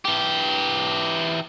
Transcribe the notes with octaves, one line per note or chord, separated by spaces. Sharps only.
E3 G4